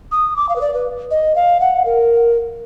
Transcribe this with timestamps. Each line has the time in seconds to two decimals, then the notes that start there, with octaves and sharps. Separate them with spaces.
0.12 D#6
0.36 D6
0.49 F5
0.56 B4
0.61 D5
0.74 B4
1.11 D#5
1.36 F5
1.60 F#5
1.85 A#4